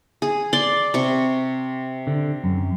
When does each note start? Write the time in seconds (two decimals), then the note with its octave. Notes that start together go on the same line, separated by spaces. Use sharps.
0.22 G#4
0.53 D5 C6
0.94 C3 C#6
2.07 D3
2.44 F#2